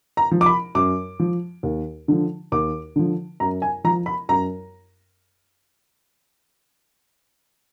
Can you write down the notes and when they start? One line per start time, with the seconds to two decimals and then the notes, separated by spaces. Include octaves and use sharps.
0.17 A#5
0.31 F3
0.41 D6
0.46 B5
0.75 F#2 D6
1.19 F3
1.63 D#2
2.08 D3 F3
2.52 D#2 D6
2.96 D3 F3
3.40 F#2 A#5
3.62 G#5
3.84 F3 A#5
4.06 B5
4.29 F#2 A#5